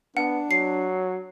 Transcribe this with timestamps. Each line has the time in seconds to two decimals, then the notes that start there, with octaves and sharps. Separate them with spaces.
0.17 B3 D4 F#5
0.51 F#3 C7